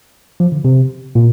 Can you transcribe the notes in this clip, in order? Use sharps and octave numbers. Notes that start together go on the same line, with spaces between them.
F3
D3
C3
A#2